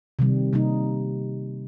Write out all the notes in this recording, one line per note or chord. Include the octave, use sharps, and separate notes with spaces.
C3 D#3 G3
C3 G3 A#3 D#4